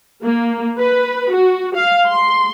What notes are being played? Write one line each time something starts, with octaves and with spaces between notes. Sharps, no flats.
A#3
B4
F#4
F5
C6